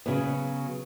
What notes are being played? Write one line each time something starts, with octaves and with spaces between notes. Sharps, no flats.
C#3 F#3 B3